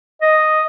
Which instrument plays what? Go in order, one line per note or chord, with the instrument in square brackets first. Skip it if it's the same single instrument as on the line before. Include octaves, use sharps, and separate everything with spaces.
[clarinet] D#5